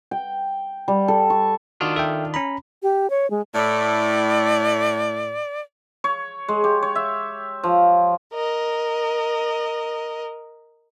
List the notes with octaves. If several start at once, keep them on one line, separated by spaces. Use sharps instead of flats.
G5
G3
A4
C#6
D#3 D4 F4 F#4
A4 E5 G5
C#4 A#5 B5
G4
C#5
G#3
A2 D5
C#5
G#3
G4
C#5
E5
F3
A#4 D#5